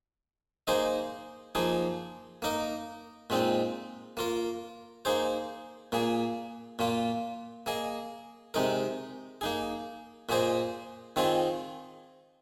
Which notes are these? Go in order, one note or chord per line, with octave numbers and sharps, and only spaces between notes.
A#3 D#4 G#4 C5 D#5
F3 A#3 D#4 G#4
A#3 D#4 A#4 D#5
A#2 G#3 C4 D#4
A#3 F4 A#4
A#3 D#4 G#4 C5
A#2 A#3 G#4
A#2 A#3 F4
A#3 G#4 D#5
C3 G#3 D#4 A#4
A#3 D#4 G#4
A#2 A#3 G#4 C5 D#5
D#3 C4 F4 G#4 D#5